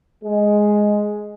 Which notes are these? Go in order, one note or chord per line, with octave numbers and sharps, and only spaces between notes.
G#3